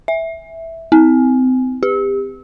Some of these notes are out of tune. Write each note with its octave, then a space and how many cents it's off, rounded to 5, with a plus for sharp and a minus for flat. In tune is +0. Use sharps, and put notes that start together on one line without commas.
E5 -5
C4 -30
G4 +30